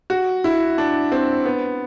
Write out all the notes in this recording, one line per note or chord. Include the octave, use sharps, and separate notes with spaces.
F#4
E4
D4
C4
B3